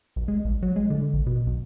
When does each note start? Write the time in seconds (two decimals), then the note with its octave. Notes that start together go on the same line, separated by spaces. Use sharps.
0.16 B1
0.28 G#3
0.45 A#1
0.62 F#3
0.76 G#3
0.90 D3
1.14 A#1
1.27 B2
1.47 B1